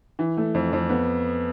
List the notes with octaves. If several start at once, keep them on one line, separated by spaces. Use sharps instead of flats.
E3
A3
F2
F2
B3